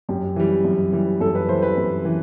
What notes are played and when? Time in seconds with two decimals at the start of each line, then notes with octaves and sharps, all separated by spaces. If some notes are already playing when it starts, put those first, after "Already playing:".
0.09 F#2 G4
0.36 E3 G3
0.65 F#2
0.93 E3 G3
1.21 F#2 A4
1.35 B4
1.49 E3 G3 C5
1.63 B4
1.77 F#2
2.05 E3